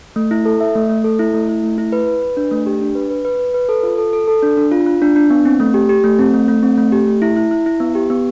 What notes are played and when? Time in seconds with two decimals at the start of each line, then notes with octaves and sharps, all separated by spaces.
0.16 A3
0.31 E4
0.45 A4
0.60 E5
0.75 A3
0.89 A3
1.04 A4
1.19 E4
1.34 A3
1.49 E4
1.63 A3
1.78 E4
1.92 B4
2.07 B4
2.22 B4
2.37 D4
2.51 A3
2.66 G4
2.81 D4
2.95 B4
3.10 B4
3.25 B4
3.39 B4
3.54 B4
3.69 A4
3.83 F4
3.98 A4
4.13 A4
4.28 A4
4.43 D4
4.57 D4
4.72 F4
4.86 F4
5.02 D4
5.16 D4
5.30 B3
5.45 C4
5.60 A3
5.74 G4
5.89 G4
6.04 A3
6.19 C4
6.34 A3
6.48 A3
6.63 C4
6.77 A3
6.92 G4
7.07 A3
7.22 E4
7.37 E4
7.51 E4
7.66 E4
7.80 B3
7.95 G4
8.10 B3